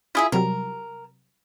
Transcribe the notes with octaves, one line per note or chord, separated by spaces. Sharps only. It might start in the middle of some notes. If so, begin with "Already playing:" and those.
E4 F4 G#4 E5
C3 F#3 G3 A#4